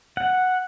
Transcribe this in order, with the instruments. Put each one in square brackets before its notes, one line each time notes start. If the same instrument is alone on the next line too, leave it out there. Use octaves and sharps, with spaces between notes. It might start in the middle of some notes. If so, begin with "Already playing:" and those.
[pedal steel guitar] F#5